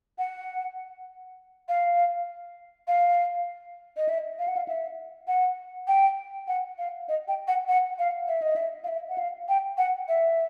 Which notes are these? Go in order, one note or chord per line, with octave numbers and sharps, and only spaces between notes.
F#5
F5
F5
D#5
E5
F5
F#5
F5
E5
F#5
G5
F#5
F5
D#5
G5
F#5
F#5
F5
E5
D#5
E5
F5
E5
F#5
F5
G5
F#5
E5